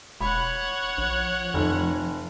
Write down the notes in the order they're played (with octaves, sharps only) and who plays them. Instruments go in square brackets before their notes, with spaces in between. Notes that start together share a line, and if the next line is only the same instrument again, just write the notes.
[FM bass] E1 [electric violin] C#5 F#5 [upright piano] B5
[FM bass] A#1 [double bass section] F3
[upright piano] F1 [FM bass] F2